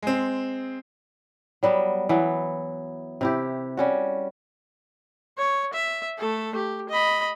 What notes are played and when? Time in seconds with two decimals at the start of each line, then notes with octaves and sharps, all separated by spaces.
0.02 G#3 C4
1.63 F#3 G3 B3
2.09 E3 F#3 B3
3.21 C3 E4 G4
3.77 G3 C#4 F#4
5.38 C#5
5.73 E5
6.18 A3 A4
6.55 G4
6.89 D#5 B5